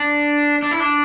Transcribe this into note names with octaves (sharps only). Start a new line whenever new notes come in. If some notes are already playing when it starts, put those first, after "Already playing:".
Already playing: D4
D4
E4
D4